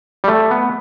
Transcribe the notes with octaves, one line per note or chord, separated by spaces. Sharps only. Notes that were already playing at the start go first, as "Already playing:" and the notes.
G3
A3
B3